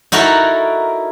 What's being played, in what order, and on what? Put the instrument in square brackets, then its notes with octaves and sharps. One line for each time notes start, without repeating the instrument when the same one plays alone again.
[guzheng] D#4 E4 F#4 A4 A#4